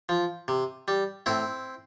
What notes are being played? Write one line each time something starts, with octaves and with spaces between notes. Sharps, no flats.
F3
C3
G3
A2 C4 E4